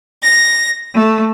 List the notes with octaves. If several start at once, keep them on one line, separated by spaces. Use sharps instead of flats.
A#6
A3